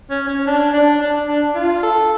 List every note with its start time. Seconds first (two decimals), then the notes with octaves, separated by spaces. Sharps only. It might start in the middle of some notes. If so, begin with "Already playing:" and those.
0.10 C#4
0.28 C#4
0.47 D4
0.74 D4
1.00 D4
1.28 D4
1.55 F4
1.83 A4